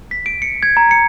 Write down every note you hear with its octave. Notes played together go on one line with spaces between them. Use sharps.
B6
D7
C#7
G#6
A#5
C#7